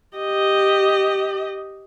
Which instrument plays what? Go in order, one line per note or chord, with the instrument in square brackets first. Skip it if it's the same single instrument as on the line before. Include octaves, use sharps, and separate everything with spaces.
[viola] G4 D#5